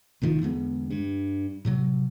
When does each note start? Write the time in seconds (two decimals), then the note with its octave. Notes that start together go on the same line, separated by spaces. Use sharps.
0.22 C2 A2 D#3 F3
0.42 E2 D3 G#3 B3
0.90 G2
1.65 A2 C3 F#3